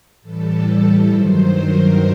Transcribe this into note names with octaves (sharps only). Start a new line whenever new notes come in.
A2 E3 G3 A4
G2 D#3 F#3 C5
A#4